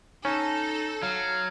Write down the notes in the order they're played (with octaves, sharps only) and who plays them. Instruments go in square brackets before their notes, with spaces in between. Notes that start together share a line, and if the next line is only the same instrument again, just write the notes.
[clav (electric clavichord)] C#4 [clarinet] D#4 [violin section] A4
[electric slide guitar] F#3 [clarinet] F5